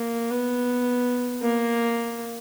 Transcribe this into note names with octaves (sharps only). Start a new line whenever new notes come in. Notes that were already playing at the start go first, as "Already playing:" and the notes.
Already playing: A#3
B3
A#3